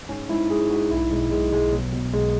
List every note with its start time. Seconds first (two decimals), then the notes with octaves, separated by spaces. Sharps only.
0.09 G#2 C#4
0.29 G#2 E4
0.50 G#2 G#4
0.70 G#2 F#4
0.90 B1 E4
1.11 B2 G#3
1.31 B1 G#3
1.52 B1 G#3
1.72 B2 F#3
1.93 B2
2.13 B1 G#3